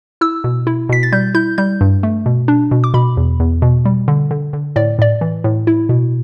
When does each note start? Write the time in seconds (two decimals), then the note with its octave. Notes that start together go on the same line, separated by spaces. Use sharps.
0.21 E4 E6
0.44 B2
0.67 E4
0.89 B2 B6
1.03 A6
1.12 G3 G6
1.35 E4 G6
1.58 G3 G6
1.81 G2
2.03 A3
2.26 B2
2.48 D4
2.71 B2
2.84 D6
2.94 B2 B5
3.17 E2
3.40 E2
3.62 B2
3.85 G3
4.08 D3
4.31 D3
4.53 D3
4.76 A2 D5
4.99 A2 D5
5.21 E3
5.44 A2
5.67 E4
5.89 B2